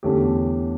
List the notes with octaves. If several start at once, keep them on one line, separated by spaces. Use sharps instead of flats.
E2 D3 A3 C#4 G4